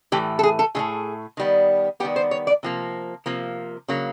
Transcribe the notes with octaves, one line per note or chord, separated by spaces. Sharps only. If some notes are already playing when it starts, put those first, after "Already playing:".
A2 E3 A3 G4
A4
G#4
A4
A2 E3 A3 G#4
D#3 G3 B3
D#3 G3 B3 G4
C5
C#5
D5
C3 F3 A#3
C3 F3 A#3
C#3 F#3 A#3